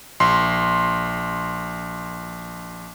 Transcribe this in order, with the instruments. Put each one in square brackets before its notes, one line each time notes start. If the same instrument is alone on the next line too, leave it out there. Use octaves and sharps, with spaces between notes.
[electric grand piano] A#1 C6